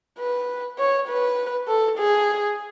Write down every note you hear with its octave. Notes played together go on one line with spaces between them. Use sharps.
B4
C#5
B4
A4
G#4